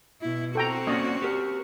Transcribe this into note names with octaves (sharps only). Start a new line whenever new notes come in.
B2 E4
C4 F#4 A4 G5 A#5
A#3 C#4 D5 D#5
G4 A#4